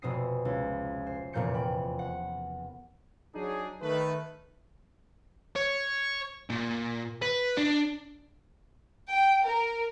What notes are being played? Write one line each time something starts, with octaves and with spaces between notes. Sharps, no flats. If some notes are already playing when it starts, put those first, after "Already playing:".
F1 B2 C4 D#6 C7
C#2
C5
F1 E2 A#2 A#3 G6 C#7
G5 B5
F#5
F#3 D4 D#4 G#4
D#3 A3 B4
C#5
A#2
B4
D4
G5
A#4